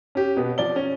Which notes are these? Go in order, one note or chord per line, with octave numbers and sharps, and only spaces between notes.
C#4 G4
B2 B3
F3 D5 G7
C#4